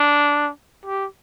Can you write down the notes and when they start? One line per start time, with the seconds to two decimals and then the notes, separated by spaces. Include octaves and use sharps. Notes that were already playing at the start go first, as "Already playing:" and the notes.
Already playing: D4
0.85 G4